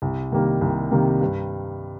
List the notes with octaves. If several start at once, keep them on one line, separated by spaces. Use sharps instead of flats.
C2
C3 D#3 G3 A#3
C2
C3 D#3 G3 A#3
G2